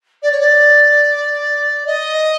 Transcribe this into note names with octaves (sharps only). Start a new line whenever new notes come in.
D5
C#5
D5
D#5